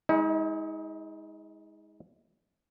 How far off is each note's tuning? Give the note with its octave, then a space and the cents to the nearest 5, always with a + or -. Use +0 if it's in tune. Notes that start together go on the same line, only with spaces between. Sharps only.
G#3 -10 D#4 +40